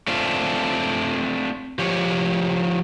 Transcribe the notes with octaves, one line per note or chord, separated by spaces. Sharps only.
A3 C4 D4 F4
F3 G4 C#5